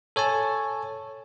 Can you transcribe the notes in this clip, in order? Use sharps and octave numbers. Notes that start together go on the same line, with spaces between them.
A4 C#5 G#5 A5